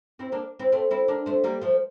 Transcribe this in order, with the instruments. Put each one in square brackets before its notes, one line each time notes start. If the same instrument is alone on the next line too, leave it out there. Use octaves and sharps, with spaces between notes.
[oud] C4 E4
A#3 D4
C4 E4
A3 C4
C4 E4
A#3 D4
A3 C4
G3 A#3
F3 A3